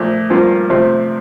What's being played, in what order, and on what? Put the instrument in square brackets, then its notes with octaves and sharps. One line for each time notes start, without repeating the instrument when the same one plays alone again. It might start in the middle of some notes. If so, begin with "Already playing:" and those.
Already playing: [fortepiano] A#2 F3 A3
G2 F3 A#3 F4
C3 F3 A3 C4